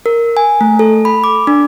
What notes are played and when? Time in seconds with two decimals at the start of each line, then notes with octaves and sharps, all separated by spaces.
0.06 A#4
0.37 G#5
0.61 A3
0.79 A4
1.05 B5
1.24 D6
1.47 D4